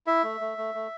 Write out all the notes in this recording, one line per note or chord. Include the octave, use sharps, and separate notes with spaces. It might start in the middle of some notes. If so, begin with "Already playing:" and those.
E4 E5
A3
A3
A3
A3